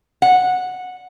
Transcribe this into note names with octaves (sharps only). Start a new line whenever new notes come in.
F#5